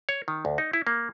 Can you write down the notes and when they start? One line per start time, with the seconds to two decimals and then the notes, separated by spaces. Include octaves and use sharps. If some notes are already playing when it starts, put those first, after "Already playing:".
0.09 C#5
0.28 D#3
0.45 D2
0.58 D#4
0.73 E4
0.87 A#3